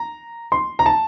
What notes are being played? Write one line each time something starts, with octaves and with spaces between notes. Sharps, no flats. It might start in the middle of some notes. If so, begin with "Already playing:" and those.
Already playing: A#5
C6
A#5
A5